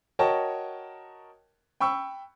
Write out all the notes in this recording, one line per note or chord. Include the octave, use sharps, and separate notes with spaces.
F#4 A#4 C#5 D#5 G5 A5
G5 B5 C#6 E6